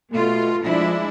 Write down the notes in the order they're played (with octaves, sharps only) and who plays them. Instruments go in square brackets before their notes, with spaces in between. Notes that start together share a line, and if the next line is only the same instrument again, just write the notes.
[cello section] B2 F4 [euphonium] A3
[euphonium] F3 [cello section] G#3 D4 E4